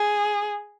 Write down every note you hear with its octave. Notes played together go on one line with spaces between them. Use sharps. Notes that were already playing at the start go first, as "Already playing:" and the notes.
Already playing: G#4